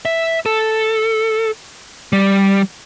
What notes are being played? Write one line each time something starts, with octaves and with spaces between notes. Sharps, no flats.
E5
A4
G3